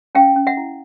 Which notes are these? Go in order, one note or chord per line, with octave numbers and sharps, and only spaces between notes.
C#4 F5 G5
C#4
E5 F#5
E4